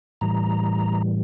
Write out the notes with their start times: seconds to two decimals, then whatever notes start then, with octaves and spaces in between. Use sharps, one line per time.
0.21 A2 E3 G3 A#5